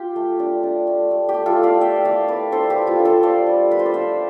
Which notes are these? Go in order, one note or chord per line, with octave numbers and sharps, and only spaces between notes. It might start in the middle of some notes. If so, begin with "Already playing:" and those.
Already playing: F4 G4
A3
D4
D4
A3
A3
G4
A3
F4 A4
E4
D5 F5
E4 E5 G5
A3 D5 F5
A3 B4 D5
D4 A4 C5
G4 B4
F4
F4 A4
D4
A4 C5
F4 D5 F5
G3
F4 B4
C5
D5
F4 C5 E5